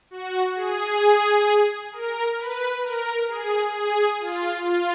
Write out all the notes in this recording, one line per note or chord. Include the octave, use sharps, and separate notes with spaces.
F#4
G#4
A#4
B4
A#4
G#4
G#4
F4
F4